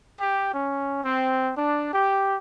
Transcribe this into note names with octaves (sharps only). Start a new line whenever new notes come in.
G4
C#4
C4
D4
G4